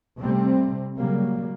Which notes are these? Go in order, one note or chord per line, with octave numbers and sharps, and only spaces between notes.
C3 G3 A3 C4
C#3 F#3 G3 A#3